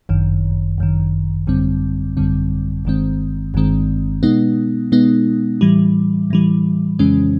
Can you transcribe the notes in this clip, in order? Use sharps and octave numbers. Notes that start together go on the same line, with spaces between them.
G1 F#2 D#3
G1 F#2 D#3
G#1 F#2 D3 G3 C4
G#1 F#2 D3 G3 C4
G1 G2 D#3 G#3 C4
G1 G2 D#3 G#3 C4
B2 G#3 B3 D#4
B2 G#3 B3 D#4
A2 E3 G3
A2 E3 G3
F2 C#3 E3 G#3 C#4